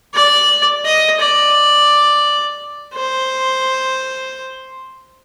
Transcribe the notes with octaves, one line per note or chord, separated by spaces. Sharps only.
D5
D#5
D5
C5